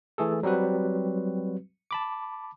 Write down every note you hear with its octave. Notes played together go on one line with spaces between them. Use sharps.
E3 A3 G#4 A4
F#3 G3 C4 F#4 B4
A5 B5 D6